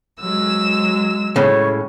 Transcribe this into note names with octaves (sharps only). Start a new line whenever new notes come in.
F#3 G#3 E6
A2 C#3 C#5